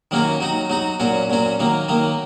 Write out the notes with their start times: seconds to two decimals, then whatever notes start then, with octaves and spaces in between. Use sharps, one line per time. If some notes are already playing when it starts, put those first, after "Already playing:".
0.11 D#3 F#3 A#3 C#4 F#4
0.41 F#3 D#4 F#4
0.70 F#3 D#4 F#4
1.00 A#2 F#3 C#4 F#4
1.30 A#2 F#3 C#4 F#4
1.60 D#3 F#3 A#3
1.88 D#3 F#3 A#3